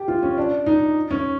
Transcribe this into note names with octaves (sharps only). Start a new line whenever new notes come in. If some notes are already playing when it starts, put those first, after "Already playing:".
Already playing: G4
F4
C#4
D4
D#4
C#4